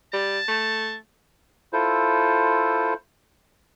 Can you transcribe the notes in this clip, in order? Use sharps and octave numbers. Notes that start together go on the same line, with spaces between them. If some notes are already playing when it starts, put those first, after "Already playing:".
G3 A5
A3
E4 F4 A4 C5